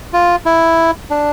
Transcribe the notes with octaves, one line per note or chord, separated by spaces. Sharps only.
F4
E4
D4